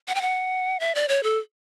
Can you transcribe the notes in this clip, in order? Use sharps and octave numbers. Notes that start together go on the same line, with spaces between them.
F#5
G5
F#5
E5
D5
C#5
A4